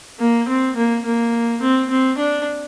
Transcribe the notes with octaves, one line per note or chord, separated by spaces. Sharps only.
A#3
C4
A#3
A#3
C4
C4
D4